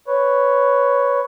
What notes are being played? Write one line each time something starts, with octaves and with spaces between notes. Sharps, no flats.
B4 C#5